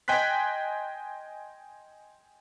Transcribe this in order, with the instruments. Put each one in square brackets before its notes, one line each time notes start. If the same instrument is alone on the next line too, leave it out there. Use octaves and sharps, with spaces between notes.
[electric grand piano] D#5 G5 G#5 C6 F#6 B6